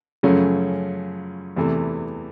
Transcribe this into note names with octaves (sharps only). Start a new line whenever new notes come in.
F#2 C#3 F3 A3 C#4
E2 C3 E3 A3